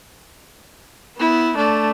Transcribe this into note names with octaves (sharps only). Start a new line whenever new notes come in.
B3 E4
A3 D4